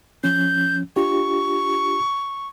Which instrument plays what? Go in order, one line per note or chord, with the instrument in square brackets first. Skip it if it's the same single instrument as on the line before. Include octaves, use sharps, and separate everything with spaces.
[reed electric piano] F3 C#4 [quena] G6
[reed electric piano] D4 F4 G4 [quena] C#6